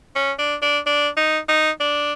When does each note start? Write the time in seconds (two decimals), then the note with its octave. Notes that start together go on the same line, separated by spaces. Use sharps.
0.16 C#4
0.39 D4
0.62 D4
0.86 D4
1.17 D#4
1.49 D#4
1.80 D4